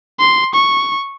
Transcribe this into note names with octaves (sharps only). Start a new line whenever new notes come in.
C6
C#6